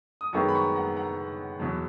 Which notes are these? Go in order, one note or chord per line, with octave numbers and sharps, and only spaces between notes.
D#6
F#2 D#3 G#3 B3 A#5 C#6
B5
A#5 C#6
F#5 A#5
F#5 A#5
E2 B2 F#3